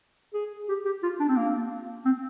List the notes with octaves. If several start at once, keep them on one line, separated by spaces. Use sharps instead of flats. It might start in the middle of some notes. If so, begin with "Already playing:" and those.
G#4
G4
G4
F4
D4
C4
A#3
C4